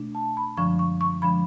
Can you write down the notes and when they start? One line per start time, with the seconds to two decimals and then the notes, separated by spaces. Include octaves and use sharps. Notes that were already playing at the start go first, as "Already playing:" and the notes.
Already playing: B2 A3 D4
0.15 A5
0.37 B5
0.57 F#2 D3 F3 G#3 D4 C#6
0.79 C#6
1.01 C#6
1.22 D3 F3 G#3 D4 B5